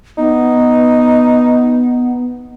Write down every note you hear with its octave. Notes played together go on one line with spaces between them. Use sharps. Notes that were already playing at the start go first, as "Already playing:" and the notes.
B3 D#4